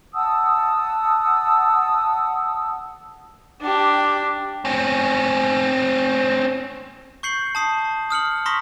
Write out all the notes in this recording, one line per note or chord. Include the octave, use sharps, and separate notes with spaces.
F#5 A5 D#6 E6
D4 G4
C4 C#4
C#6 G6 C7 C#7 F#7
A5 D#6 C7
D#6 F6 C#7 F#7
A#5 C6 C#6 D#6 A#6 B6